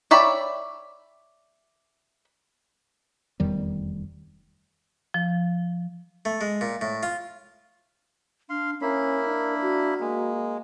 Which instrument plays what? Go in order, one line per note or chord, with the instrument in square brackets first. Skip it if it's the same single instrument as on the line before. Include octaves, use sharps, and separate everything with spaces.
[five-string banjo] C#5 D5 E5 G5 B5
[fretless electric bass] F1 E2 D#3 G3
[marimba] F3
[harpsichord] A3
G#3
A#2
A2
F4
[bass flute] D4 [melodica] F5 C6
[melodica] A#3 E4 B5 [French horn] C#4 [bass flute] A#4
[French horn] D4
[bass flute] F#4
[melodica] G#3 [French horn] A#3